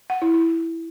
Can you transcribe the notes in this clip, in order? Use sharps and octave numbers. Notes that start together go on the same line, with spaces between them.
F#5
E4
E4